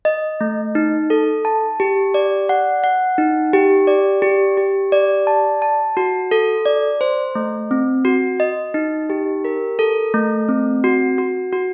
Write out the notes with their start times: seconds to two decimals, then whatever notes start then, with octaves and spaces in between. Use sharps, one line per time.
0.05 D#5
0.41 A3
0.75 D#4
1.10 A4
1.45 A5
1.80 G4
2.14 D5
2.49 F#5
2.84 F#5
3.18 D#4
3.53 G4
3.87 D5
4.22 G4
4.57 G4
4.92 D5
5.27 A5
5.62 A5
5.97 F#4
6.31 A4
6.66 D5
7.01 C5
7.35 A3
7.71 C4
8.05 F#4
8.40 D#5
8.74 D#4
9.10 G4
9.45 A#4
9.79 A4
10.14 A3
10.49 C4
10.84 F#4
11.18 F#4
11.53 F#4